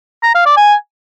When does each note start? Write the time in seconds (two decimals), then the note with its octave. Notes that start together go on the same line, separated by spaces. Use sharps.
0.23 A#5
0.35 F5
0.46 D5
0.57 G#5